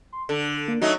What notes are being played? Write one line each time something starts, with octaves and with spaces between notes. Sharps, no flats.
C6
D3 A4
A#3
F#3 A3 D#4 F#4